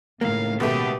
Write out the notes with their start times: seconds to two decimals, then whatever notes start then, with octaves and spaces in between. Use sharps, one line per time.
0.21 C#2 A2 D#3 A#3 F5
0.60 B2 A3 G4